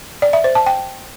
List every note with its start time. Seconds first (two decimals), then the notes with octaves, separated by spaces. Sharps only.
0.22 D5
0.33 E5
0.44 C5
0.55 A5
0.66 G5